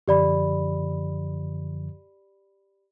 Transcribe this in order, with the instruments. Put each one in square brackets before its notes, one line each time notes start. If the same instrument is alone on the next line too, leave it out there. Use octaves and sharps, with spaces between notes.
[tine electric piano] F#2 D3 F3 [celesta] G4 D5 B5